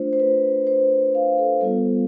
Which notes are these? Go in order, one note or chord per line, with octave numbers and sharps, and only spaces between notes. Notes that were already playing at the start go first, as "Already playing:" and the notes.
Already playing: A3 D4 F4 C5
C5
B4
C5
F5
A4
G3 B3 F4 A4